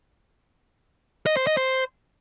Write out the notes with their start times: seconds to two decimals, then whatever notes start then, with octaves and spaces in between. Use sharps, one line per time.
1.26 D#5
1.37 C5
1.47 D#5
1.57 C5